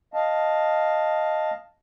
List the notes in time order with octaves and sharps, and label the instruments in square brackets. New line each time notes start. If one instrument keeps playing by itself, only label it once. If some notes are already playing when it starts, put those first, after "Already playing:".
[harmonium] D#5 F5 A5